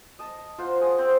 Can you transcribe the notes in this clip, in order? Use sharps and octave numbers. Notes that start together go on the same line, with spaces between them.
D#5 A5
F4 C5 F#5
G#4 F#5
C4 G5